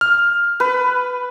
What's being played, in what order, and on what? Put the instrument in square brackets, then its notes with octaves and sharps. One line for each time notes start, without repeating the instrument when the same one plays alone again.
[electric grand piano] F6
[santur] B4